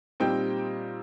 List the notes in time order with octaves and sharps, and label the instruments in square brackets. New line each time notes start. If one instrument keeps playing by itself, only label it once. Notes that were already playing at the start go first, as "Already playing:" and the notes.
[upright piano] A#2 G3 C4 D#4 G5